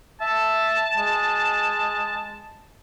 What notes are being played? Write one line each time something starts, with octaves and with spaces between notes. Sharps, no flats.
E5 A5
G#3